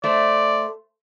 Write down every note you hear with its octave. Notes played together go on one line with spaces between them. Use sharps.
A3 C5 D5